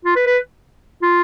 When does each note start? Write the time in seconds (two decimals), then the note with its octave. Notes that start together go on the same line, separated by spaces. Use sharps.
0.05 F4
0.16 B4
0.27 B4
1.02 F4